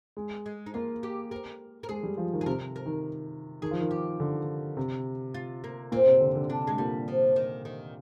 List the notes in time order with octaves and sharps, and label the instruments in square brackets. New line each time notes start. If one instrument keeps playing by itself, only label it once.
[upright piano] G#3
[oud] G#3
D#4
[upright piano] A#3 [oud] F4
[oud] G4
A#4
A#4
[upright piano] G#3 [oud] G#4
[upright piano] G3
F3
D#3
[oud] G#4
[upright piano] C3 [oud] A#4
[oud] A#4
[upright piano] D#3
[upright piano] D#3 [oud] G#4
[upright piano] F3
D#3
[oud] G4
[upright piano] D3
C3
[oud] F4
A#3
[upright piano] A#2 [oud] C4
[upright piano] C3
D3
D3
[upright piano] C3 [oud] D4
[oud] G#3
[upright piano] A#2 [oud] G3
[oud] F3
D#3
D#3